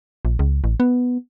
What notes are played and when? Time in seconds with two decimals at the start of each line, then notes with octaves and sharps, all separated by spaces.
0.25 A#1
0.39 C#2
0.64 A1
0.80 B3